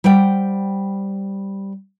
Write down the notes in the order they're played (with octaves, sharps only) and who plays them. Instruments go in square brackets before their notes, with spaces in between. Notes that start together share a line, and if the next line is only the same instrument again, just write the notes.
[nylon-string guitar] G3 C5 F#5 G5